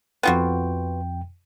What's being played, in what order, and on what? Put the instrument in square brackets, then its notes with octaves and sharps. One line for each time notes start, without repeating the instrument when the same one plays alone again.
[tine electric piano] F2 G5 [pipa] B3 F4 F#4